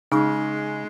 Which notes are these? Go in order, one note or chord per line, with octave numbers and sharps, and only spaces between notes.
C#3 G#3 D#4